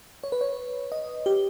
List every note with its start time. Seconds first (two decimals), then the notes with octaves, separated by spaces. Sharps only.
0.24 C#5
0.32 B4
0.41 C#5
0.92 D#5
1.26 G4